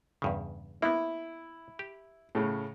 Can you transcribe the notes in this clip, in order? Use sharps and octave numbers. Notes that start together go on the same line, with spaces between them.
E2 G2 C#3
A#3 B3 E4
G4
A2 C#3